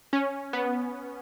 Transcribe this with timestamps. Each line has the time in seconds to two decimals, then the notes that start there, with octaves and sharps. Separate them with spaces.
0.13 C#4
0.53 B3